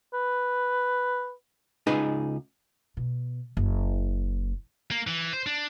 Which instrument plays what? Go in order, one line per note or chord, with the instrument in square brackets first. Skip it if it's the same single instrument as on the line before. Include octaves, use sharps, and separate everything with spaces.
[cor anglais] B4
[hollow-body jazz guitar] C#2 D#4 G#4 B4
[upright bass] B2
F#1
[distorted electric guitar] A#3
E3
C5
D4